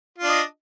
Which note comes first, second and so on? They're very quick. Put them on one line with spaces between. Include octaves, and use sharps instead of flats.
F4 D4 D#5